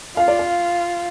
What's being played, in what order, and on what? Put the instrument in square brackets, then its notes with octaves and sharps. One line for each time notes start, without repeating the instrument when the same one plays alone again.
[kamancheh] F4 [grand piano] F5
[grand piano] D5
F5